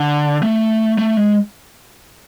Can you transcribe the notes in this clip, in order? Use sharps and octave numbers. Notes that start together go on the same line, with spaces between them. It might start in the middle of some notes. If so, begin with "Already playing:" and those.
Already playing: D3
A3
A3
G#3